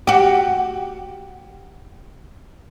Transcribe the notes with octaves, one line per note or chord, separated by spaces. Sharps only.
F#4 G4